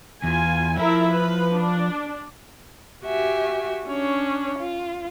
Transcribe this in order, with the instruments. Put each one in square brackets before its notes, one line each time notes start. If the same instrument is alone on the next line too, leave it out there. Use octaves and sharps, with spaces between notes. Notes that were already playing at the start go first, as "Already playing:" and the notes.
[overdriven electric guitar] E2 [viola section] F4 G#5
[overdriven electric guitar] F3 [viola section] E4 A#4 E5
[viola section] B4
D4
[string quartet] F#4 G4 E5 G#5
C#4 D4 C#5
F4